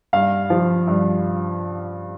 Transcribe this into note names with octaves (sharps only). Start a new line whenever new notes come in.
G2 F5
F3
G2